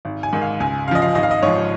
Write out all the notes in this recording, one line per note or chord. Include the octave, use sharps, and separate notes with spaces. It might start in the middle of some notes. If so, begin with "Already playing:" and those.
G#1
G#5
G#2 D#3
F5
C#2 G#5
C#3 F3 D#5 F5
F5
G#1 D#5
F5
D#5
G#2 F3 C#5